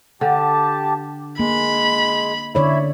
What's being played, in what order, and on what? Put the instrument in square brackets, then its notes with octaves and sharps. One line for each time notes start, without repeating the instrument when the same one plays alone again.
[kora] D3 [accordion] G4 A5
[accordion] G#3 [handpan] A#3 [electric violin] B5
[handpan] D3 C#5 D5 [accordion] E4 E5 B5